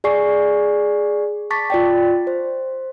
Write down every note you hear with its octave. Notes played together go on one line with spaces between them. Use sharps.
G#4 D5 G#5 C#6 C7
A5 C#6 D6 A6 B6
F4 D5 G5
C5